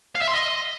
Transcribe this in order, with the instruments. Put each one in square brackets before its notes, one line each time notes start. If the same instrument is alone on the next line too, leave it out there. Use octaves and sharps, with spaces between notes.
[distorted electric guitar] F5
E5
C6
D#5